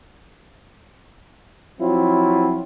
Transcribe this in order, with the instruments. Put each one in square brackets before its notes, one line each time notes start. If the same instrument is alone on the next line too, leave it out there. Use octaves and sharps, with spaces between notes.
[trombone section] F3 F#3 C4 E4 F4